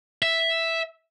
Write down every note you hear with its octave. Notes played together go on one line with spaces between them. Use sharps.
E5